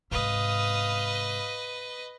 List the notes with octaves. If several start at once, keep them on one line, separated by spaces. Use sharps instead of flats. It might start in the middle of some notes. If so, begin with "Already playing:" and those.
G#2 C3 B4 D#5 F5 D#6